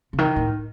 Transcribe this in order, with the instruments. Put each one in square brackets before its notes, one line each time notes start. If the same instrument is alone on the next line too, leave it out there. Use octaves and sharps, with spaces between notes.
[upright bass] C#3
D#3
A2